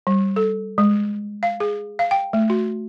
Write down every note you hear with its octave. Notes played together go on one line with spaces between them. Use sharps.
G3
A4
G#3
F5
G#4
F5
G5
A3
F#4